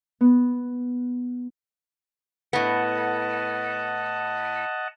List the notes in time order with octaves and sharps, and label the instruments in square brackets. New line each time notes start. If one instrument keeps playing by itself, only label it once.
[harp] B3
[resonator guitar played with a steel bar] A2 B3 [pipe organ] D#5 F#5 A5